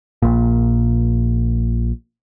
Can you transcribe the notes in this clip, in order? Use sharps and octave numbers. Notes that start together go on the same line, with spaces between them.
A#1 A#2